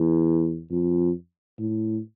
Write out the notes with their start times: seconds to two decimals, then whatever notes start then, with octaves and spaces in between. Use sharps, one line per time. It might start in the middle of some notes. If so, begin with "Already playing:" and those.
Already playing: E2
0.71 F2
1.59 A2